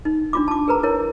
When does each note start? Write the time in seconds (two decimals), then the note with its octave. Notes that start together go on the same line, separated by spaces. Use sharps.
0.05 D#4
0.33 D4 F4 D6
0.48 A5 D6
0.68 G#4 A#4 B4 A#5
0.83 E4 A#4 C#5